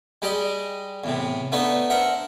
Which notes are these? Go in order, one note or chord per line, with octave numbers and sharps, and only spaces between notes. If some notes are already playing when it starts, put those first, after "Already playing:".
G3 G#3 G4 D5 D#5
E2 A2 C3
A3 B3 D4 D#4 B4 C#5
D4 A#4 C5 E5 F#5